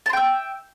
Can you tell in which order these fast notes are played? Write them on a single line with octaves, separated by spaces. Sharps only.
A5 C6 G5 E5